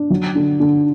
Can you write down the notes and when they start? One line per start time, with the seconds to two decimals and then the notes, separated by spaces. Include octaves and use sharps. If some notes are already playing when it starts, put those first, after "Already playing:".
Already playing: D4
0.10 F#3
0.35 D3
0.60 D3